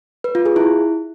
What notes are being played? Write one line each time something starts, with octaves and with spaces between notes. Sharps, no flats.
B4
F4
G#4
E4